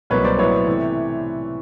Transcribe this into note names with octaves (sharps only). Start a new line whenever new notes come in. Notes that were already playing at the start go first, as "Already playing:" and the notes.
C2 B2 F#3 A#3 B4 C#5
C5 D5
A2 F#3 B3 E4 B4 C#5
C3 E3 A3